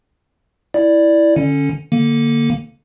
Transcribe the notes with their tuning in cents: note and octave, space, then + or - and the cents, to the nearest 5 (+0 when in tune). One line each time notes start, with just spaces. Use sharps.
E4 +0 D5 +0
D3 +0 C#4 +0
D3 +0 A#3 +0